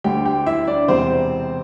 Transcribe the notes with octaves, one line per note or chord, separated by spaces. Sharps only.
D2 D3 G4 G5
G4 G5
E4 E5
D4 D5
E1 E2 C3 C4 C5